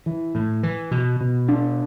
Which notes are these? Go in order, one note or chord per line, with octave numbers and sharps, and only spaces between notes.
E3
A2
E3
B2
B2
D4